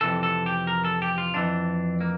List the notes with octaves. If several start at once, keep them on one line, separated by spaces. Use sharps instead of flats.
F2 C3 E3 A4
A4
G4
A#4
A4
G4
F4
F2 E3 D4
A#3